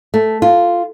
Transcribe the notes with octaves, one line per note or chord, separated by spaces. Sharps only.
A3
F4